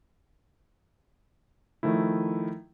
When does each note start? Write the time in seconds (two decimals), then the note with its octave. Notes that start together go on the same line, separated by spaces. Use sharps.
1.83 D#3 F3 A3 E4